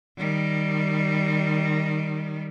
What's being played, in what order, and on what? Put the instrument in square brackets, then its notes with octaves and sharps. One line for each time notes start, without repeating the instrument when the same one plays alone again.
[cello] D#3 G3